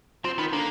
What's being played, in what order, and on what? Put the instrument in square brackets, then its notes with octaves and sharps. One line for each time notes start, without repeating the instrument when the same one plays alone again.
[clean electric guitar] F3 [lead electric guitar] C4
[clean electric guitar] D#3 [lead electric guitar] B3
[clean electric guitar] D3 [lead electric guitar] A#3